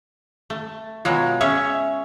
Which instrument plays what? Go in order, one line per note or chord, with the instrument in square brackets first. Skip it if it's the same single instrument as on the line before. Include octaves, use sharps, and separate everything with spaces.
[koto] A3
[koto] B2 F#3 G#3 [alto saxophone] F4
[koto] C#4 G#4 C#5 [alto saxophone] E5